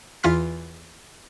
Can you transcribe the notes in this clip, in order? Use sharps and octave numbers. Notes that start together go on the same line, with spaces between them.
E2 E3 F4 C6 F6 B6